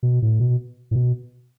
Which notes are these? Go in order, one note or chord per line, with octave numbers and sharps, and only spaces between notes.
B2
A2
B2
A2
B2